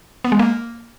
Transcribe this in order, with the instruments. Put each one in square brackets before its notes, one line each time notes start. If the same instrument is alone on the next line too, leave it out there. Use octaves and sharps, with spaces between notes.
[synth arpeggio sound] B3
G#3
A#3